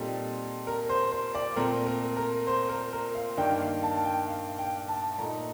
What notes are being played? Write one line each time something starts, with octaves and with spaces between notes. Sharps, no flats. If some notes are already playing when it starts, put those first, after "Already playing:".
Already playing: A#2 G3 C4 D#4 A4
A#4
C5
C5
D5
A#2 A3 C4 A#4
A#4
A#4
C5
A#4
A#4
F5
G2 D#3 A#3 D4 G5
F5
A5
G5
F5
G5
A5
A#2 A3 D#4 A#5